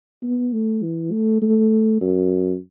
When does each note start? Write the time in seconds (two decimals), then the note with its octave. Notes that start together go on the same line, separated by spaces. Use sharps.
0.23 B3
0.53 A3
0.83 E3
1.12 A3
1.42 A3
2.01 F#2